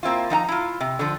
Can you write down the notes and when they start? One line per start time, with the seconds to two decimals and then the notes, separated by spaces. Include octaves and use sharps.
0.03 A#3 C4 E4 F4
0.30 F3 D#4 F#5 A#5
0.48 E4 F4
0.81 C3
0.99 D3 F3